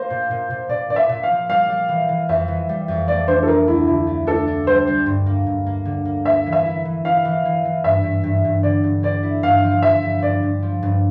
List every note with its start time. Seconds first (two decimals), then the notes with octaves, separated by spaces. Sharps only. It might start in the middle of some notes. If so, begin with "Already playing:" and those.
Already playing: A#3 C5
0.10 A#2
0.31 A#2
0.50 A#2
0.69 A#2 D5
0.90 A#2 D5
0.96 E5
1.09 A#2
1.23 F5
1.30 F3
1.49 G3 F5
1.69 G3
1.89 E3
2.09 E3
2.29 F2 E5
2.48 E3
2.69 G3
2.88 F2
3.08 A3 D5
3.28 D4 C5
3.43 A4
3.47 A3 A#4
3.68 D2 E4
3.87 D3 E4
4.07 A3
4.27 D4 A4
4.48 D4
4.67 G3 C5
4.87 G3
5.06 G2
5.26 A#3
5.47 G2
5.66 A#3
5.85 D3
6.05 A#3
6.25 A#3 E5
6.46 E3
6.53 E5
6.65 E4
6.85 E3
7.05 E4 F5
7.25 E3
7.45 E3
7.65 E3
7.84 G2 E5
8.04 G2
8.24 G2
8.45 G2
8.63 D3 D5
8.83 G2
9.03 D3 D5
9.23 E4
9.43 G2 F5
9.63 F3
9.82 F3 E5
10.02 G2
10.23 G2 D5
10.43 G2
10.62 F3
10.83 G2